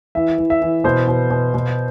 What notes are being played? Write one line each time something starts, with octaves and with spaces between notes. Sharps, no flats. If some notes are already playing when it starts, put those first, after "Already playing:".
E3 E5
E3
E5
E3
B2 C5
B2
B2
B2